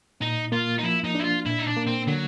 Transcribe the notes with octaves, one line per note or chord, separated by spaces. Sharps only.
A#2 D#4
A#3 F4
D#4
F3 E4
D#4
D4 E4
F4
A#2 E4
D#4
D4
A#3
C4
D3 F#3